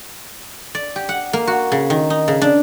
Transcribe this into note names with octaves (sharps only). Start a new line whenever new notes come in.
D5
G4
F#5
A#3
F#4
C#3
D#3
D#4
C#3
D4